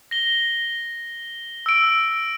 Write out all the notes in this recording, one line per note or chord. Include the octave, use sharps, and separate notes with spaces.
A#6 G7
E6 D7